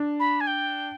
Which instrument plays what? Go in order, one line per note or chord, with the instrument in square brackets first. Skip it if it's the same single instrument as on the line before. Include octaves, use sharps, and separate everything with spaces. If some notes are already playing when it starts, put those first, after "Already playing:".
Already playing: [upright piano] D4
[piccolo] B5
G#5
G5